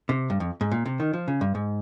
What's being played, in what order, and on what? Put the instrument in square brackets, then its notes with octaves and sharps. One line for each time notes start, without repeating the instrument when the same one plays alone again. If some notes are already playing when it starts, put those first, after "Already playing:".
[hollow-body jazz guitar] C3
G2
F2
G#2
A#2
C3
D#3
F3
C#3
G2
G#2